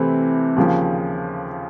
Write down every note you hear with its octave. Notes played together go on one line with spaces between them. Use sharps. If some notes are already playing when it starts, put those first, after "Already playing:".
Already playing: C3 E3 A3 C4 E4
D#2 C#3 F3